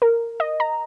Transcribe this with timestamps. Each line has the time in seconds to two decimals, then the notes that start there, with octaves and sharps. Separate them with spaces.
0.02 A#4
0.40 D#5
0.60 A#5